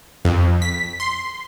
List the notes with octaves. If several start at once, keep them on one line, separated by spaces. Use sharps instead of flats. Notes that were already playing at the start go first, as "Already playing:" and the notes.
F2
B6
C6